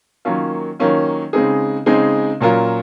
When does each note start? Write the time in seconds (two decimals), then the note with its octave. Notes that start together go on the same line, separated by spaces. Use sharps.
0.25 D#3 F#3 A#3 C#4 F4
0.80 D#3 F#3 A#3 C#4 F4
1.33 C#3 G#3 C4 D#4 G#4
1.86 C#3 G#3 C4 D#4 G#4
2.41 A#2 F#3 C#4 F4 A#4